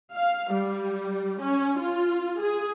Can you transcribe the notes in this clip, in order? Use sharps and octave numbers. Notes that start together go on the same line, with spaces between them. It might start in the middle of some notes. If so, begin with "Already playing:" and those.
F5
G3
C#4
F4
G#4